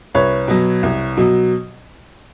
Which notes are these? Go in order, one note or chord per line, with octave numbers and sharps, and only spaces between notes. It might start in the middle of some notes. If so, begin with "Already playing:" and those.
C2 B4 C#5
B2 F#3
C2
B2 F#3